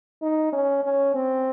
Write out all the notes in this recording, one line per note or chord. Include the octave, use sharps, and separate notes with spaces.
D#4
C#4
C#4
C4